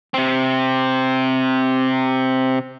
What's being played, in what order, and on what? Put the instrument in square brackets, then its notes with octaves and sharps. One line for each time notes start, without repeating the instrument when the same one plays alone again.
[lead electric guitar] C3 C4